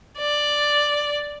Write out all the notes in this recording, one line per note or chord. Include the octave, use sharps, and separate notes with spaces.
D5